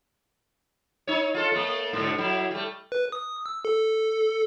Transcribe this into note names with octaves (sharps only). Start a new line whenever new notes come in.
D#4 C#5
F4 A4
A3 A#3
G#2 B2 D3
F#3 E4
G3 A3
B4
D#6
E6
A4